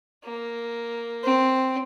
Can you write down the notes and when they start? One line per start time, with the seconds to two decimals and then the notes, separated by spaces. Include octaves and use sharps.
0.25 A#3
1.24 C4